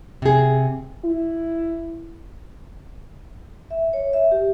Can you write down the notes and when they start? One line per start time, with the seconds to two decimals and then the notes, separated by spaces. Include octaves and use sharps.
0.22 C3 G#4
1.04 E4
3.70 E5
3.93 C#5
4.13 E5
4.31 G4